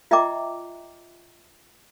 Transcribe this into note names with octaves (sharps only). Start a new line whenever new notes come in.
F4 D#5 E5 G5 A#5 D6